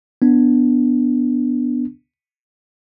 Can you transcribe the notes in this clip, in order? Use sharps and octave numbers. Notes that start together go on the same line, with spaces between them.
B3 D4